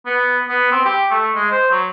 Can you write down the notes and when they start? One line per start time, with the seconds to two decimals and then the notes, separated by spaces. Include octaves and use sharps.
0.06 B3
0.49 B3
0.72 C4
0.85 G4
1.10 A3
1.35 G#3
1.51 C5
1.71 F#3